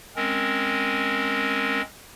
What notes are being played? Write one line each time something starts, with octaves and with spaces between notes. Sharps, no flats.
G#3 C4 C#4 A#4